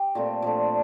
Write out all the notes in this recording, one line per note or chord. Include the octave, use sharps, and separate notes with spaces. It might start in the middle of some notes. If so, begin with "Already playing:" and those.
Already playing: G4
A#2 A3 C4 F4
A#2 F3 A3 D4